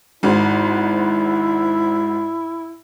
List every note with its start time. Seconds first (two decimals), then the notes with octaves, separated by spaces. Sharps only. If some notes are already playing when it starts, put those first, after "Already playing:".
0.23 G#1 G#2 E4